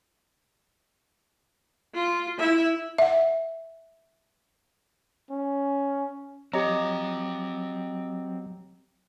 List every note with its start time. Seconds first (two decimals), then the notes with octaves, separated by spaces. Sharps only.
1.95 F4
2.39 E4 E5
2.98 E5 F#5
5.31 C#4
6.53 F#3 C4 G4 D#5 F5 A#5